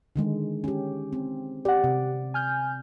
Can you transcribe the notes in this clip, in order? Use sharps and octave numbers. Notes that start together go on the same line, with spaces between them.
D3 D#3 G#3
C#4 G4
C4
G4 D5 F#5
C3
G#5 F6 G6